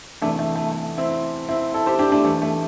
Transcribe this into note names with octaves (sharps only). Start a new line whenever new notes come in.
E2 C3 E3 A3 D4
A3
A3
A3
C4 E4
C4 E4
E4 A4
G4 C5
D4 G4
A3 D4
E2 E3 A3
A3